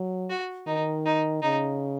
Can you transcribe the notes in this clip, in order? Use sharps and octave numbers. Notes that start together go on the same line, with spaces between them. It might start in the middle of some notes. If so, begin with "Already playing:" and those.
Already playing: F#3
F#4
D#3 D#4
D#4
C#3 D#4